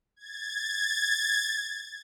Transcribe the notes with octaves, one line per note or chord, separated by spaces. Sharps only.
G#6 A6